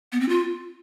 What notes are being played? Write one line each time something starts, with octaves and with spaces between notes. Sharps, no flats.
B3
C4
F4